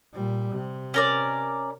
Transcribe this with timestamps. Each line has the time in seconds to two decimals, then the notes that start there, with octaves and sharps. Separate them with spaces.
0.13 A#2 G3
0.53 C3
0.94 C#4 A#4 D5